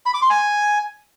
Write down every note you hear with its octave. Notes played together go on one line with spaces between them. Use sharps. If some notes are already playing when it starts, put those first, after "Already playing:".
B5
D6
C6
G#5